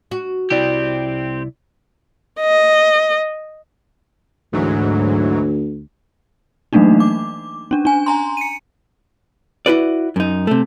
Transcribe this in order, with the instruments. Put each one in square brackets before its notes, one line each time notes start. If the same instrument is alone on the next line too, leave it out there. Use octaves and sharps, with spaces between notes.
[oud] F#4
[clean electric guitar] C2 E4 D5 [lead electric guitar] C4 G4
[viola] D#5
[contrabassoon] D2 [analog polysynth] G#2 E3 F#3
[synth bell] E3 F#3 A3 A#3 D4 D#4
D6
C#4 D4
D4 G#5
G#5 A#5 C6
C#7 D#7
[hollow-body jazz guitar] E4 F#4 B4 D5
F#2 D#4
C3 A3